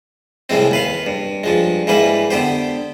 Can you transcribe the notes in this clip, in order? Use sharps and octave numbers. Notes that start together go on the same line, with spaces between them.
C2 A2 E3 G#3 C4
D#2 B4 F5
G2
G2 F3 G#3
G#2 E3 G3 A#3 B4
D3 B3 G4 C5